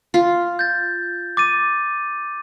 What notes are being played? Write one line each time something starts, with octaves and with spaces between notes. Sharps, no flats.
F4
G6 A6
D6 A6 D#7